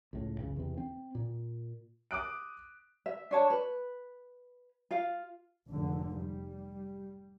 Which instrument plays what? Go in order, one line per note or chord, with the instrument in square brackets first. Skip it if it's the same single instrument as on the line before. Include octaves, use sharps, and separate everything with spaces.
[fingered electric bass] C#2 A2
F#1 C#2 C#3
E2 C3
C4
A#2
[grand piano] D6 D#6 F#6 D7
[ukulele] E5
D4 C#5 A5
B4
F4 F5
[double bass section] F1 G#2 D3
G3